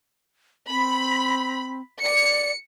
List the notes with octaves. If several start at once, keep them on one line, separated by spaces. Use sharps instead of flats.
C4 B5
D5 C#7